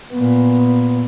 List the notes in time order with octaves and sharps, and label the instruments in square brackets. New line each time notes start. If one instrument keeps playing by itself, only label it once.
[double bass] A#2 B3